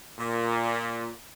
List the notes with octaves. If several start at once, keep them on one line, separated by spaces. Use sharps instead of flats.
A#2